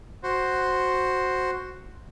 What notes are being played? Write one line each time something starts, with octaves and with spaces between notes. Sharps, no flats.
F#4 C5